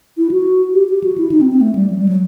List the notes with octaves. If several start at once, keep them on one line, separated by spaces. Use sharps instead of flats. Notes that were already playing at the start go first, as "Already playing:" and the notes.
E4
F#4
G4
G4
F#4
E4
D#4
C4
C4
A3
G3
F#3
G3
F#3